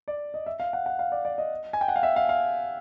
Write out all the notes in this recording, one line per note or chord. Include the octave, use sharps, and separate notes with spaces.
D5
D#5
E5
F5
F#5
F#5
F5
D5
D5
D#5
G#5
G5
F#5
F5
E5
F5
F5